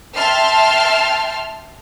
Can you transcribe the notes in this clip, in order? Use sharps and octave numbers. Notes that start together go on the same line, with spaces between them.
E5 G5 A5 C6 F6